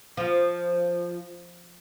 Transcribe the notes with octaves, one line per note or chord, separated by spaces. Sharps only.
F3